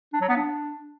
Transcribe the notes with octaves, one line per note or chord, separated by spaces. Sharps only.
D4
F#3
B3
D4